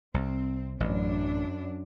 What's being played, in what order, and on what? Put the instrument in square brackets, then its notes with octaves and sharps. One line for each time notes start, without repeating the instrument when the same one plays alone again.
[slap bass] C2 [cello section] C4
[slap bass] A1 [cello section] F#2 D4